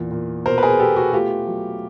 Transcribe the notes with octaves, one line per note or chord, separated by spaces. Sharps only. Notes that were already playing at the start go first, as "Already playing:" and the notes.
Already playing: E2 A#2
A#2
B2 A#4 C5
B4
G#4 A#4
B3 G4 A4
F#4 G#4
A3 F4 G4
F#3